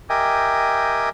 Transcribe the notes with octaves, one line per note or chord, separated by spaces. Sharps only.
G4 A#4 D#5 E5 G5 G#5